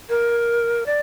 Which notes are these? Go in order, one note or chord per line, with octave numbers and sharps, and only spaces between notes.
A#4
D5